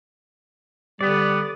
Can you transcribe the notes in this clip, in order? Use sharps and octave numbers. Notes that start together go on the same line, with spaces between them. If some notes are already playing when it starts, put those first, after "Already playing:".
D3 G3 B3 D5